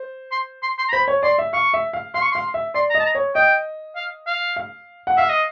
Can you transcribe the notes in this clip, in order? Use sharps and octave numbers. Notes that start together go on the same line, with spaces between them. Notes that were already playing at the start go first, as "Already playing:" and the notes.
Already playing: C5
C6
C6
C6
A#5
C5 B5
C#5
D5 C6
E5
F5 C#6
E5
F5
F5 C6
C#6
F5 C6
E5
D5 C6
A#5
D#5
A5
A#5
C#5
D#5 G5
F5
F5
F5
F#5
E5 F5
D#5